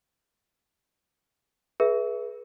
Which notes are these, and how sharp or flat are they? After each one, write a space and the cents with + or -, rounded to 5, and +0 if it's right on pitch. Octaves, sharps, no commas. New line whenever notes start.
G#4 +15 B4 -25 E5 +0